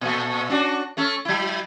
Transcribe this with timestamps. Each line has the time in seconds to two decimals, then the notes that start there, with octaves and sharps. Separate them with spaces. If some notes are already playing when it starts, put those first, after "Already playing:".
0.01 A#2 A3
0.50 C#4 D4 F#4
0.97 A3 C#4 A4
1.25 F#3 E4